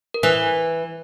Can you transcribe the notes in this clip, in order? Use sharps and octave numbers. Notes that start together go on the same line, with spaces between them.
A#4
E3 B4